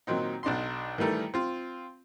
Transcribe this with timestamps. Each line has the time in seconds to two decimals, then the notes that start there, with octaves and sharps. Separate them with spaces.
0.07 A#2 D#3 F#3 C4 D#4
0.43 B1 D4 D#4 C6
0.98 D#3 E3 G3 A3 A#4
1.34 C4 F4